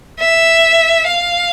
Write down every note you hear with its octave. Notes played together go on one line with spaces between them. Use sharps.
E5
F5